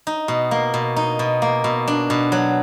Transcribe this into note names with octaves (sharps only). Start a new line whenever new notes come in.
D#4
B2
A#3
B2
D#4
B2
A#3
B2
D4
B2
F#3